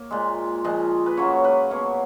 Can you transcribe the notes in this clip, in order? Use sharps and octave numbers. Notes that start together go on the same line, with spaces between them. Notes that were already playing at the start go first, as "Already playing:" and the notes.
Already playing: A#3 C#5
A#2 G#3
A#2 F3 G#3 D#5
B4
C#3 F#3 A#3 C#5
B4
B2 A#3 C#5